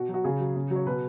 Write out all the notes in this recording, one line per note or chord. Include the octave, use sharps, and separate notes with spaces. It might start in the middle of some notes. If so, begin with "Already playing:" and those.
Already playing: B2 F#4
F#3
F#4
C#3 G#4
F#3
C#3
F#3
C#5
B2 B4